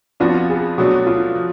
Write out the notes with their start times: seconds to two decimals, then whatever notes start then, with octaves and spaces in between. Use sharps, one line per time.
0.20 F2 F3 B3 D4 F4 F#4
0.49 G#4
0.78 B2 F#3 A3 D4 F#4
1.07 F4
1.35 F3